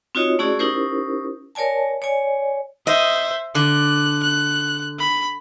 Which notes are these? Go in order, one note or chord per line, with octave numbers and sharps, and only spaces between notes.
C4 D#4 F4 F#4 C#5 D#5
A3 C#4 E4 F#4 G#4 D5
C#4 D#4 E4 G4 A#4 C5
A#4 C#5 D5 G#5 A5
C#5 D5 G#5
C5 D#5 E5
D3 F#6
F#6
B5